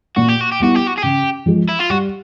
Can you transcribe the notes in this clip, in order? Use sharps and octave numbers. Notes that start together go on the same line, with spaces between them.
A#2 F#4
G4
F#4
G4
G3 B3 E4 F#4
G4
F#4
G#4
C#3 G4
F3 G#3
E4
F4
G3 F#4